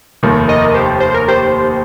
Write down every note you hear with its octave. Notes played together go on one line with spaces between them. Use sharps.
F1 D#2 D#3
A#4 D#5
G4 C5
C5
A#4
G4 C5